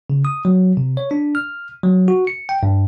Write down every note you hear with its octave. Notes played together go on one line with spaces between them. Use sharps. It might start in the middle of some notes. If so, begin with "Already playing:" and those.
C#3
D#6
F#3
C3
C#5
D4
F6
F#3
F#4
C#7
G5
G2